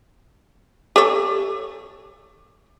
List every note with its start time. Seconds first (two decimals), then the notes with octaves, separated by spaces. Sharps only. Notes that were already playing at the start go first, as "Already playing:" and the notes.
0.96 G4 A4 C#5